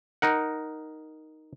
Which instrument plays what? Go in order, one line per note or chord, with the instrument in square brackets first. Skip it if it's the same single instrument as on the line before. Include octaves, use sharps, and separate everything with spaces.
[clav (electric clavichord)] D#4 A#4 F#5